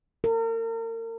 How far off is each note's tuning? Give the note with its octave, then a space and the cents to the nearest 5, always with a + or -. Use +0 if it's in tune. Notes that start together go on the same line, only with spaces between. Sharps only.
A#4 -40